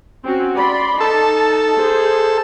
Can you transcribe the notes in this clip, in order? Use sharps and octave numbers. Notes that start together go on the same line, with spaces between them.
C4 C#4 F#4
D5 B5 C6
D#4 A4 A5
G#4 C5